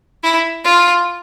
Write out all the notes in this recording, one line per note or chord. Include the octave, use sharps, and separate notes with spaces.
E4
F4